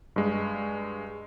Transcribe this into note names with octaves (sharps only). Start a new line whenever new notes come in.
G2 G#3